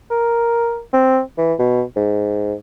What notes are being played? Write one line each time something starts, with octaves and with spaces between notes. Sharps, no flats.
A#4
C4
E3
B2
G#2